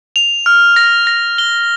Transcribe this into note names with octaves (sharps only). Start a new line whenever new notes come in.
F7
F6
A#6
A#6
G7